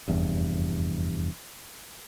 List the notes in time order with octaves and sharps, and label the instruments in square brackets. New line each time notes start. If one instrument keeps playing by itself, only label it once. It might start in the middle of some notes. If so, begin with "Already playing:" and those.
[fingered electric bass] F1 E2 G2